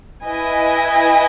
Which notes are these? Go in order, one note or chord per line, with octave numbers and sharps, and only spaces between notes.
E4 B4 D#5 G#5